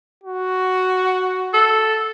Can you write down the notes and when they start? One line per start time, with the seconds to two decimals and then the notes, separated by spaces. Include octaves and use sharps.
0.23 F#4
1.53 A4